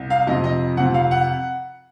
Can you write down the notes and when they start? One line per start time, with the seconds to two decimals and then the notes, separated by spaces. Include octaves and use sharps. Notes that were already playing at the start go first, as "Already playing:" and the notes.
Already playing: C2
0.10 F5
0.27 F2 C3 F3 D#5
0.44 D#5
0.77 F2 C3 F3 F#5
0.94 F5
1.11 F#5